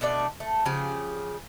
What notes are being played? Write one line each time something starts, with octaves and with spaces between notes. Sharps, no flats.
B2 A3 D4 D5
A3
C#3 F3 G4 G#4